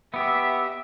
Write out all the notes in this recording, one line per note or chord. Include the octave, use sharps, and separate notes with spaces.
B3 G4 E5